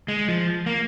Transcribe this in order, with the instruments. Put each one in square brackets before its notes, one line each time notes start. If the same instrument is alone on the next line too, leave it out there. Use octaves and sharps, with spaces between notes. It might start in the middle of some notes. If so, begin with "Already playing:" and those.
[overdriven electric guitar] G#3
F3
A#3